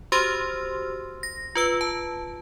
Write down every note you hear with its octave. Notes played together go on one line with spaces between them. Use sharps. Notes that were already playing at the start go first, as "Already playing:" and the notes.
F#4 G4 C5 C6 E6 F6
A#6
F4 B4 E6
A5